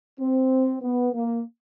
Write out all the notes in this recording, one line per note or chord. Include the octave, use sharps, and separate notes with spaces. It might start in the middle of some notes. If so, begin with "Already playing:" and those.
C4
B3
A#3